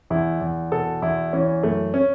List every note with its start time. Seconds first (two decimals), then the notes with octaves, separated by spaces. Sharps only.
0.10 E2 E4
0.41 E2
0.72 B2 A4
1.02 E2 E4
1.33 E3 C#4
1.63 F#2 A3
1.94 C#4